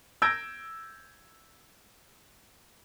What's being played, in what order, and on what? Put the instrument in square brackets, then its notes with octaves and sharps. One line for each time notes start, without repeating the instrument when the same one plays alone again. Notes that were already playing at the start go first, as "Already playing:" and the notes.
[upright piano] E6 G6 G#6 A#6 D7